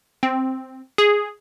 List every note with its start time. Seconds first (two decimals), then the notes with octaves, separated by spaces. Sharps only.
0.23 C4
0.98 G#4